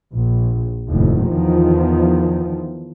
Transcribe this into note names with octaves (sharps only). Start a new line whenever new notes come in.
A#1
F1 D#2 A2
E2 D#3 F3